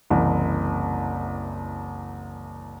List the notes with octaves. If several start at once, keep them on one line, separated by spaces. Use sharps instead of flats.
F#1 C2 E3